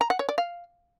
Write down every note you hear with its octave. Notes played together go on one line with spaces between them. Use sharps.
A#5
F#5
C#5
D5
F5